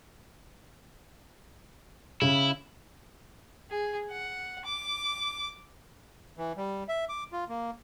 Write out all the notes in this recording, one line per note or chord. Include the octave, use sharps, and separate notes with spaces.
C#3 E4
G#4
F#5
D6
E3
G3
E5
D6
F4
A#3